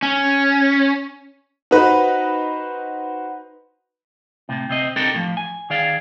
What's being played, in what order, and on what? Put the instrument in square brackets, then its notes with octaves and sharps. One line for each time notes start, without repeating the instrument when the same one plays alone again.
[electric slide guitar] C#4
[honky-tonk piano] D#4 B4 [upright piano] F#4 C5
[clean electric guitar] A2 C3
C3 C4 D#5
C4 D4 D#4 G4 A4 A#4
A2 E3 F3
G#5
D#3 G#4 D5 F5